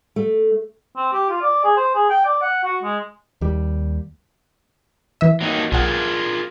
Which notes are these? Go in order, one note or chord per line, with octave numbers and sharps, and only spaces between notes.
A3
C4
G4
F4
D5
G#4
C5
G#4
G5
D5
F#5
F#4
G#3
D#2 G3
E3 E5
F#3 A#3 D#4
B1 F4 G#4 A#4 F#5